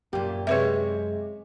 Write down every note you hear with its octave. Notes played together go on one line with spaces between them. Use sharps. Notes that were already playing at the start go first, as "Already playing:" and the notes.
F#2 A#2 A#3 G4
C3 G#3 G#4 B4 C#5 E5